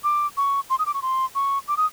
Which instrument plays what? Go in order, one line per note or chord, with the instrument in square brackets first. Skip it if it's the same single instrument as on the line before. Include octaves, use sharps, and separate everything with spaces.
[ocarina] D6
C#6
C6
D#6
D6
C#6
C6
C#6
D6
D#6